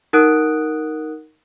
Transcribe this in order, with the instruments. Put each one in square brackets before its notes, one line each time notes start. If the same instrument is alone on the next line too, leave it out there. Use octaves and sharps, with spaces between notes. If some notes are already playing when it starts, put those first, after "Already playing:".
[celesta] D#4 A#4 F#5 D#6 F#6 D7